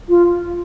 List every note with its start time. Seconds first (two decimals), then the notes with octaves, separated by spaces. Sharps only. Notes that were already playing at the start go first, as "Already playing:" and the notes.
0.09 F4